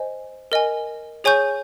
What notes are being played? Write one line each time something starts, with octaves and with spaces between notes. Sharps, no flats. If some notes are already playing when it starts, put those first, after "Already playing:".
Already playing: C5 D#5 G#5
A#4 D#5 G#5
G#4 C#5 G#5 C#6 G6